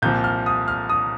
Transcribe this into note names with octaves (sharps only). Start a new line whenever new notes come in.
C2 A#2 F3 G6
F6
D#6
F6
D#6